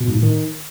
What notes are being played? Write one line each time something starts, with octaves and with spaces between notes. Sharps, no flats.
B2
G#2
A2
D#3